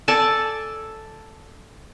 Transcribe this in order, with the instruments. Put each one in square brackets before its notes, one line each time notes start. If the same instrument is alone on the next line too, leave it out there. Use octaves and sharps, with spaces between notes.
[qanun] A4 D5 G#5 A5